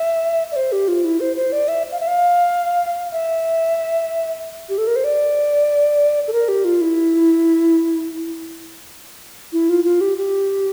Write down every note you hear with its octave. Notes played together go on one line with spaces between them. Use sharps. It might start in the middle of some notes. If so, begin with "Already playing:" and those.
Already playing: E5
D5
C5
G4
F4
E4
C5
C5
D5
E5
F5
E5
F5
E5
G4
A4
A#4
C5
D5
A4
A#4
G4
F4
E4
E4
F4
F4
G4
G4